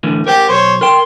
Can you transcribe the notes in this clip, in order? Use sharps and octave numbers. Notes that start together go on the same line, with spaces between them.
A2 D3 E3
G4 A#4 C5 G5
B1 C5 C#5
A#4 G5 C6